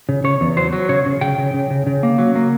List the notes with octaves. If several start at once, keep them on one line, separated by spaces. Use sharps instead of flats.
C#3
C#3 C#5
E2
F#3 C5
F#3
C#3 C#5
C#3
C#3 G5
C#3
C#3
C#3
C#3
A#3
F#3
A#3